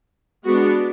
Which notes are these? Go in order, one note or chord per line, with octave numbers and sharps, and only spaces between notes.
G#3 B3 D4 F#4